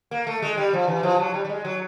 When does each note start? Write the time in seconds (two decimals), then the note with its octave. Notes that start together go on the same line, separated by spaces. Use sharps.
0.11 A#3
0.27 A3
0.42 G#3
0.57 G3
0.73 F3
0.88 E3
1.03 F3
1.19 F#3
1.34 G3
1.45 G3
1.49 G#3
1.65 F#3